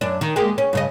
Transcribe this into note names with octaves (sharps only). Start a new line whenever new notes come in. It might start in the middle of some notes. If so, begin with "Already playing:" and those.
F#2 D4
D#3
G#3 A#3 G4
C#4
G2 C#3 D#5